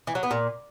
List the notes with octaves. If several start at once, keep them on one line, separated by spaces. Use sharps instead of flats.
E3
F#3
B3
A#2